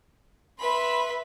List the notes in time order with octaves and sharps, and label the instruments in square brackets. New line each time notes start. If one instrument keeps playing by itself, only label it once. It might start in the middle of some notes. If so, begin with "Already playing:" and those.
[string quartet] B4 B5 [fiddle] E5 C6